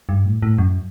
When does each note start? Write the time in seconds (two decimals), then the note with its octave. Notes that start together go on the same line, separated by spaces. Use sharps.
0.09 G2
0.25 A2
0.42 A2
0.58 F#2